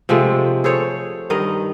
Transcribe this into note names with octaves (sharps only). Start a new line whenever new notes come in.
C3 F3 G#3 A3
G#4 A4 C5 C#5
G2 D#3 A#4 D#5